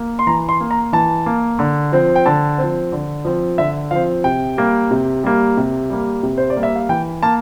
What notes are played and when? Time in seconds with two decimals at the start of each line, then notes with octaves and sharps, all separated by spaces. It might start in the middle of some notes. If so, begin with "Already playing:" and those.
Already playing: A#3
0.19 C6
0.27 E3 A#5
0.49 C6
0.61 A#3
0.71 A#5
0.93 E3 A5
1.26 A#3
1.59 D3
1.92 F3 C4
2.16 G5
2.26 D3 A5
2.58 F3 C4
2.92 D3
3.25 F3 C4
3.58 D3 E5
3.91 F3 C4 F5
4.24 C3 G5
4.57 G3 A#3
4.91 C3
5.24 G3 A#3
5.57 C3
5.90 G3 A#3
6.23 C3
6.38 C5
6.50 D5
6.56 G3 A#3
6.63 E5
6.76 F5
6.89 E3 G5
7.23 A#3 A5